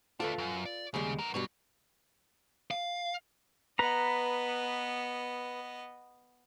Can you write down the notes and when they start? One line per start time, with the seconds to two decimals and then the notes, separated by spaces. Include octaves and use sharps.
0.20 A3 D4 F4 A4 B4
0.38 F#2
0.65 D5
0.94 D#2 C#3 G3 G#3
1.19 B3 A#4
1.34 G2 B2 F#3 G3
2.71 F5
3.79 B3 B4 D#5 A#5